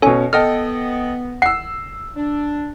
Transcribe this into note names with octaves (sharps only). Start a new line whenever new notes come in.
B2 C#4 A4 G#5
B3 A4 D#5 G5 F6
F#5 E6 C7
D4